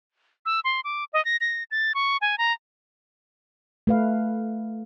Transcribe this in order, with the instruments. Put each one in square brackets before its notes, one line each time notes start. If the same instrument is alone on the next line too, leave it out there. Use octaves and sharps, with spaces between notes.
[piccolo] E6
C6
D6
D#5
A#6
A#6
A6
C#6
G#5
A#5
[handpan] A3 B4 F5